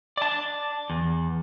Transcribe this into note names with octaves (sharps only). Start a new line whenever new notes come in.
D5 A5
E2